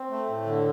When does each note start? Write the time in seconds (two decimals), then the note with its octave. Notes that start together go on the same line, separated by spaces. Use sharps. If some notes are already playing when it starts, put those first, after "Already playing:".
Already playing: C4
0.10 A3
0.28 A2
0.46 D3